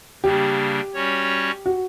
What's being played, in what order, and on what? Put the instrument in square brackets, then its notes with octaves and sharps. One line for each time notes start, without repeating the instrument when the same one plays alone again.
[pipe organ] C#3 G3 A#3 D4 [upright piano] G4
[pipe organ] G3 C#4 F#4 C#5
[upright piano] F#4